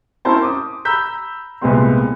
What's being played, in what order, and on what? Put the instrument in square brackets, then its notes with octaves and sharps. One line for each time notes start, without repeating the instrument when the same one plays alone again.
[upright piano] C4 C#4 E4 A#4 C5 A5
D6 D#6
A#5 B5 E6 G6 B6
C2 A#2 G#3 B3 C4 C6